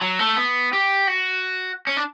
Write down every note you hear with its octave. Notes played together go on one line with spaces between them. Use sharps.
F#3
A3
B3
G4
F#4
C#4
D4